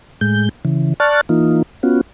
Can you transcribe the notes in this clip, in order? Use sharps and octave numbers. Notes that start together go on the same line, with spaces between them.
A2 G#3 G6
C#3 E3
D5 A5 C#6 F6 F#6 A6
E3 A#3 D#4 F4
B3 C#4 F4 F#4